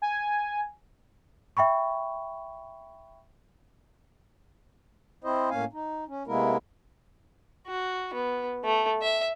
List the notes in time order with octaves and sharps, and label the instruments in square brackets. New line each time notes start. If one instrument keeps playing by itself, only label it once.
[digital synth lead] G#5
[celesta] E5 G5 B5 C#6
[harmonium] C4 E4 C5 D#5
A2 A#3 C#4 F5 G#5
D#4
C#4
C3 G#3 A#3 B3 E4 A#4
[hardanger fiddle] F#4
B3
A3
E5